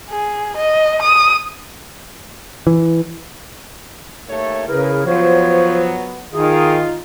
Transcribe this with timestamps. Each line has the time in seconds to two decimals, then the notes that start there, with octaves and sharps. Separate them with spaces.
0.10 G#4
0.57 D#5
1.02 D#6
2.67 E3
4.28 D#2 A3 C#5
4.68 C#3 E4 G#4 A#4 B4
5.06 F3 F#3 B3 C5 C#5
6.33 D#3 D#4 F4 G#4